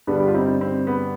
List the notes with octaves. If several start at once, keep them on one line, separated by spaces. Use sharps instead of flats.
G2 D3 G3 B3 D4
G4
F4
C4 D#4
C4
B3